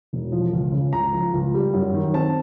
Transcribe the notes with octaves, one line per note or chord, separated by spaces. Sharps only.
E1
F3
C#2
C#3
C#2 A#5
F3
C#2
G3
F#2
D#3
C4 A5